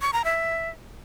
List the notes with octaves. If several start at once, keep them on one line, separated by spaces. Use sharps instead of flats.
C#6
A#5
E5